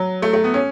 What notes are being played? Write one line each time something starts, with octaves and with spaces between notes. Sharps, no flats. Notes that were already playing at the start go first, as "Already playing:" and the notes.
Already playing: F#3
A3
A3
B3
C#4